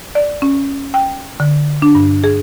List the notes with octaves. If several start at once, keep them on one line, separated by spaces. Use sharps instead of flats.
D5
C#4
G5
D3
D4
G2
G#4